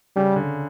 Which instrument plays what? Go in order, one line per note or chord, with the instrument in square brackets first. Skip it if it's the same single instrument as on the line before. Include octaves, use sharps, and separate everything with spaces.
[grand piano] C#3 [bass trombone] G3
[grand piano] D3